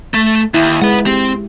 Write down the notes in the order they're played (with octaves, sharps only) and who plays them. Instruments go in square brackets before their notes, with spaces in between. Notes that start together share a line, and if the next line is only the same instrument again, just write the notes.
[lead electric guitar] A3
[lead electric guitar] D#2 [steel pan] E4
[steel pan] G#3 [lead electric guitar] B4 F#5
[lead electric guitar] C4 [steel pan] G4